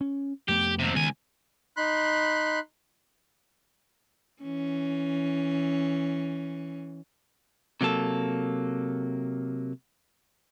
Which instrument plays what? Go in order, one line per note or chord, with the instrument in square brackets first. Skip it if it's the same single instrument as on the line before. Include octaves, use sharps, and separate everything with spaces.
[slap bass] C#4
[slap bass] F2 A3 B3 [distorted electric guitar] G4
[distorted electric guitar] D#2 C3
[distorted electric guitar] C#2 G#5 [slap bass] D#3 B3
[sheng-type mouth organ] D#4 B5 C6 F#6
[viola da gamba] E3 C#4
[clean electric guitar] C3 F#3 A#3 A4